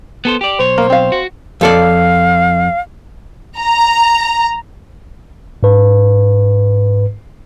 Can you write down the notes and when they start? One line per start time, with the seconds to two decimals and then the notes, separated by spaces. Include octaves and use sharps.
0.25 B3 A4 C5
0.41 G4 D5
0.59 B1 C5 C#5
0.78 A#3
0.90 C4 F5
1.12 F#4
1.61 F2 A4 D5 F5
3.58 A#5
5.63 G#2 B4